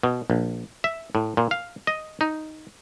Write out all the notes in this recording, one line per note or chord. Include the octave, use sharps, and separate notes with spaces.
B2
A#1
E5
A2
A#2
F5
D#5
D#4